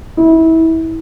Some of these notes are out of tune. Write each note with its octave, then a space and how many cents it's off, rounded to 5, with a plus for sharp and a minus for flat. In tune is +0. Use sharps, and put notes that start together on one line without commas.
E4 -25